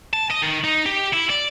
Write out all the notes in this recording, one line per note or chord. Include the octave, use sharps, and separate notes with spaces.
A5
D#5
D#3
D#4
G4
E4
D5